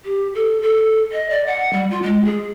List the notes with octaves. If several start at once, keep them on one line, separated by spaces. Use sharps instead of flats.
G4
A4
A4
D#5
D5
F#5
G3
F4
G#3
G#4